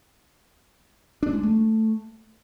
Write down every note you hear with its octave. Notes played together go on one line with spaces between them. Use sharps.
D4
G#3
A3